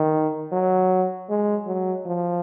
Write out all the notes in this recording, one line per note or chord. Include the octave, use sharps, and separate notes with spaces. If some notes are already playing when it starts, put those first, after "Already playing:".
Already playing: D#3
F#3
G#3
F#3
F3